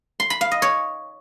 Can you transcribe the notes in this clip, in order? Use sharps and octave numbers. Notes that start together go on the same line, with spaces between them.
C6
B5
F5
D#5
C#5